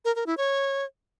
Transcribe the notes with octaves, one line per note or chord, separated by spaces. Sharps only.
A#4
A#4
E4
C#5